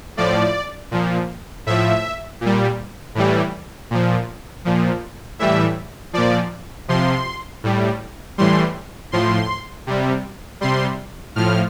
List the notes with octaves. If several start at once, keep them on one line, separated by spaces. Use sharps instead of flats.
A2 F3 D5
A#2 F3
A2 F3 E5
A#2 G3
A2 E3 G3
A#2 F3
A#2 F3
A2 E3 G3 E5
A#2 F3 D5
C3 F3 C6
A2 G3
A2 E3 G3 C6
A2 F3 C6
C3 G3
C3 G3 C6
A2 F3 F6